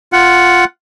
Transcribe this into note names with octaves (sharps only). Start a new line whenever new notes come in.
F4 F#5